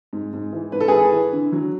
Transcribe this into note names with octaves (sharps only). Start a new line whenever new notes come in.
G#2
G#2
E3
G#2 B4
A4
E3 G#4 B4
E3
D3
F#3